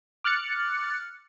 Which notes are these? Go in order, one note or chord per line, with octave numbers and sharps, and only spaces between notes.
D6 F6 F#6 A6 C#7